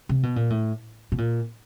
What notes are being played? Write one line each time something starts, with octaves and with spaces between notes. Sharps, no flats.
C3
B2
A#2
A2
B2
A#2